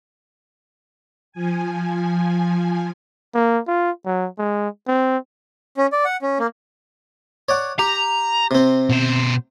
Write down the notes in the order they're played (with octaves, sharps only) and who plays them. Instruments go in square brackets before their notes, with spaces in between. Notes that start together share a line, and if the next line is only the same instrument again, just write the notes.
[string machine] F3 G#5
[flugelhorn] A#3
F4
F#3
G#3
C4
[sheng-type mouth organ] C#4
D5
F#5
C#4
A#3
[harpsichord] C#5 D5 F#5
[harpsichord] G4 [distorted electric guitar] A#5
[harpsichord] C3 C4
[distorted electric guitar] B2 C5